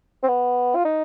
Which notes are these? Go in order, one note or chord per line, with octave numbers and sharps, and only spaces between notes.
C4
B3
F4
D#4